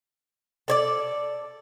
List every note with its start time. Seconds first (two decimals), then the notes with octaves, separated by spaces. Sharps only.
0.68 A4 C#5 D5